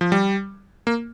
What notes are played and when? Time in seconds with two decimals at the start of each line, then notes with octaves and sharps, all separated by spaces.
0.01 F3
0.12 G3
0.87 A#3